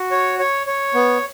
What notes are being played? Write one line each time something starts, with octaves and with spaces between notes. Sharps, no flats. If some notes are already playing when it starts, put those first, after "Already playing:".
Already playing: F#4
C#5
C#5
C#5
B3